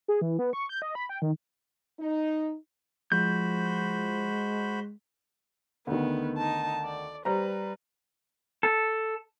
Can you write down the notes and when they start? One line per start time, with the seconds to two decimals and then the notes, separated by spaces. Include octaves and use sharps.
0.08 G#4
0.21 E3
0.39 B3
0.53 C#6
0.69 G6
0.82 D#5
0.95 B5
1.09 G5
1.22 D#3
2.00 D#4
3.12 F3 G#3 F#4 C5 B5 G6
5.87 D2 D#3 B3
6.37 D#4 A5
6.84 D5
7.25 G3 B4 C5 A#5
8.63 A4